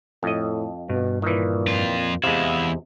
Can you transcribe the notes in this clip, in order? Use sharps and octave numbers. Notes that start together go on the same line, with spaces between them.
F2 A2 D#5
G2 B2
A#2 D#3 E3
F2 F4
E2 C3 G#3 E4 F5